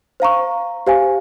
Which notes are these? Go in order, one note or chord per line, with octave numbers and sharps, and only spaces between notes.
C5 F5 A#5 C#6
G4 C5 F5 G#5